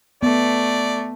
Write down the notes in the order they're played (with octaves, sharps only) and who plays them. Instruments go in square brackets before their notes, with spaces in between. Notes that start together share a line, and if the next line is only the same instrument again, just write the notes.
[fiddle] A3 [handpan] B3 [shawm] D5